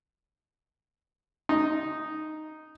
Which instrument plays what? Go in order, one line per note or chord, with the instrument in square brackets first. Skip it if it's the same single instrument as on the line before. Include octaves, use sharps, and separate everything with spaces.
[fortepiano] D#4